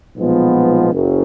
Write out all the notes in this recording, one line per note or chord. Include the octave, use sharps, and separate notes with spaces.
B1 A#2 F3 G#3 B3
F#1 F#2